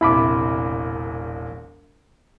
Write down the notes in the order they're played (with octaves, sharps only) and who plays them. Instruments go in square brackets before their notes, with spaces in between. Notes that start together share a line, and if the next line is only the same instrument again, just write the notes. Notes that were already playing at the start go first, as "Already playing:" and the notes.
[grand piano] E1 A#1 C3 [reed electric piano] E4 B5 D6